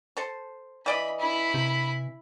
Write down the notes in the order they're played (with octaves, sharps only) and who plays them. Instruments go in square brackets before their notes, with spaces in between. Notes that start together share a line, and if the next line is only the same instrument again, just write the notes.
[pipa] A4 C5
[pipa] E3 D5 D#5 [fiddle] B5
[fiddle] E4 B5
[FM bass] C3